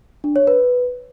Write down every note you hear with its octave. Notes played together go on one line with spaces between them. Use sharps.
D4
C#5
B4